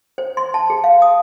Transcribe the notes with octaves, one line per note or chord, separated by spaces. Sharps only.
C5
C6
A5
G#4
F5
D#6